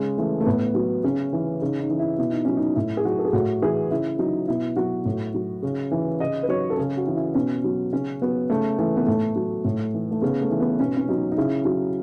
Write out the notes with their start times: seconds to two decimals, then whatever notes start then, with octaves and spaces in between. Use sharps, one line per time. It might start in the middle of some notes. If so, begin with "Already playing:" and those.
Already playing: C#3 G#3
0.18 E3 A3
0.41 A3
0.46 A2 B3
0.75 F#3
1.04 C#3 C#4
1.33 E3
1.61 C#3 D#4
1.80 D#4
1.89 E3
1.99 E4
2.18 B2 E4
2.32 D#4
2.45 F#3 C#4
2.57 D#4
2.75 A2 E4
2.97 G#4
3.05 F#3 F#4
3.19 A4
3.25 G#4
3.33 A2 F#4
3.62 E3 G#4
3.91 C#3 E4
4.19 F#3 D#4
4.48 B2 E4
4.76 F#3 F#4
5.05 A2
5.34 F#3
5.62 C#3
5.91 E3
6.20 C#3 D#5
6.43 B4
6.48 F#3 C#5
6.70 A4
6.77 C#3 G#4
6.97 F#4
7.07 E3
7.16 E4
7.35 B2 C#4
7.64 F#3
7.92 C#3 C#4
8.22 F#3 B3
8.50 C#3 A3
8.79 E3 A3
8.97 B3
9.07 A2 A3
9.36 F#3
9.65 A2
9.94 E3
10.11 A3
10.22 C#3 B3
10.41 A3
10.51 E3
10.60 B3
10.80 B2 C#4
10.97 C#4
11.09 F#3 D#4
11.32 D#4
11.37 C#3 E4
11.65 F#3